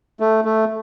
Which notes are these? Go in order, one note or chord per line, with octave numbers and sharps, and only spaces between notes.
A3
A3